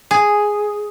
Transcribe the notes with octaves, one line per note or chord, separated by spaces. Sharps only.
G#4